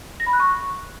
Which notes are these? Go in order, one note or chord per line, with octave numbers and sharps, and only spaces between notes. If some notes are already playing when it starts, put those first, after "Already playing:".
A#6
B5
F#6
C#6